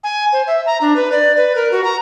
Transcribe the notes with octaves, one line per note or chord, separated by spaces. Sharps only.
G#5
C5
E5
A#5
D4
B4
D5
B4
A#4
F#4
A#5